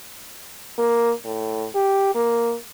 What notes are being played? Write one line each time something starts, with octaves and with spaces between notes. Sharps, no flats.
A#3
A2
G4
A#3